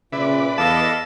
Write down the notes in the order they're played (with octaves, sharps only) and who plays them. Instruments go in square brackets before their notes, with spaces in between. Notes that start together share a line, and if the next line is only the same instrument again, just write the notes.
[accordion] A#2 [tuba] C#3 [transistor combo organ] B4 D5 [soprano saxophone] E5
[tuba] E2 [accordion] A4 D#5 F5 [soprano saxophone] A5